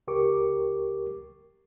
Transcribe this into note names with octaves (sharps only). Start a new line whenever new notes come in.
C#2 G4 A#4 C#6 D6